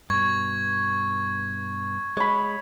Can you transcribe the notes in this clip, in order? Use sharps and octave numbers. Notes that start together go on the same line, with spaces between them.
G2 B2 C#6 G#6
G#3 C#5 B5